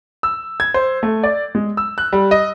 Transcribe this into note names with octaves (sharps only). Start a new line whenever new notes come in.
E6
G#6
C5
A3
D5
G#3
E6
F#6
G3
D#5